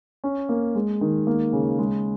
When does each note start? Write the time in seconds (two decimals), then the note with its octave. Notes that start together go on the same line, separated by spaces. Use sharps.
0.24 C#4
0.49 A#3
0.75 G#3
1.01 D#3
1.27 A#3
1.53 C#3
1.79 G#3